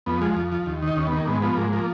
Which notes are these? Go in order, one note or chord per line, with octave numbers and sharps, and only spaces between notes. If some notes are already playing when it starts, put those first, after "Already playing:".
F2 B3
F3 G#3
F2
F3
D#2
D#3 D#4
D#2 C#4
B3
D#3
A#3
G#2 B3
F3 B3
G#2 A#3
F3 A#3